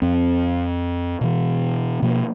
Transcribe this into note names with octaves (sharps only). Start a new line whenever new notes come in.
F2 C4
B2 E3
B2 F3 A#3